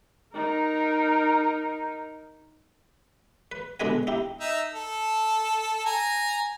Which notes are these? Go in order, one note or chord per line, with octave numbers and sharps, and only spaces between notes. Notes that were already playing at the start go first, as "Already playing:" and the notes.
D#4 A#4
B4
B2 D3 G#3 D4 B4 G#5
D#4 E4 G4
D#4 E5
A4
G#5 A#5